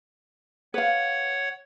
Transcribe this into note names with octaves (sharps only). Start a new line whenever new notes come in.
B4 C#5 F5 F#5